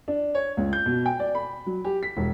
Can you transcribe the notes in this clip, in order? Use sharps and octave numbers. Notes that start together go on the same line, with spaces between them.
D4
C#5
C#2
G6
B2
G5
D5
B5
F#3
G4
B6
E1